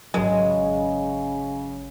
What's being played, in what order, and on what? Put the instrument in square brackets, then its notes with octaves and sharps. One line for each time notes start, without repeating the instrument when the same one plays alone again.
[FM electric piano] G#1 F#3 [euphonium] C#3 [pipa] G#3